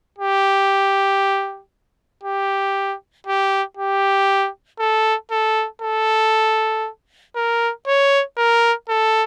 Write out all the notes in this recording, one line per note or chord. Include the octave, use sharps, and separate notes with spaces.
G4
G4
G4
G4
A4
A4
A4
A#4
C#5
A#4
A4